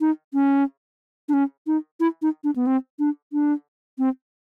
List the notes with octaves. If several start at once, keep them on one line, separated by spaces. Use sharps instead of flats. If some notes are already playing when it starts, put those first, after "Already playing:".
D#4
C#4
D4
C#4
D#4
E4
D#4
D4
B3
C4
D4
D4
C4